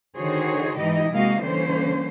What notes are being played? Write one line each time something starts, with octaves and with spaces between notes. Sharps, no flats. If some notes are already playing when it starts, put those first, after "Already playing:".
D3 D#3 F#4 G#4 C5 C#5
G#2 E3 D#4 E4 G4 D#5
C3 G#3 A#3 F#4 D#5 F5
D3 E3 G3 A#3 C#4 C5